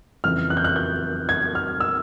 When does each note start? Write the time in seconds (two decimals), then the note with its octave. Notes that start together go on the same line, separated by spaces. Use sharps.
0.24 F2 C#3 E3 F6
0.50 F#6
0.57 G6
0.64 F#6
0.76 G6
1.29 G#6
1.55 F6
1.80 E6